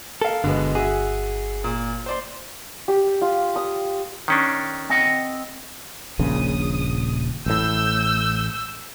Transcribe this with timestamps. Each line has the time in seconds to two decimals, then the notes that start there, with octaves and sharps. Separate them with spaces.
0.22 A4 A#4 F5
0.44 G1 B2 D3 G#3 B3
0.75 F#4 G#4 E5
1.64 A#2
2.06 C5 D5 C6
2.88 G4
3.22 F4
3.56 D#6
4.28 D#3 C#4 D4
4.90 C4 D#5 F#5
6.19 D#1 A#1 C#3 D#6
7.46 A1 A2 E6 G6